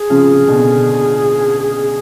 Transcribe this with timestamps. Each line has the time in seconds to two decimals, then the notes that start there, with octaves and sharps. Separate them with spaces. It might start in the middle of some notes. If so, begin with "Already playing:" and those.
Already playing: G#4
0.10 C#3 F3
0.48 B2 D3
1.60 G#4